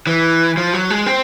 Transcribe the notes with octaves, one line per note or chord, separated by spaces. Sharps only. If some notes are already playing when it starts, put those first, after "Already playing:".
E3
F3
F#3
G#3
C4